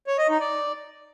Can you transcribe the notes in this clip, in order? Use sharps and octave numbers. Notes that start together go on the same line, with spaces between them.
C#5
D#5
D#4
D5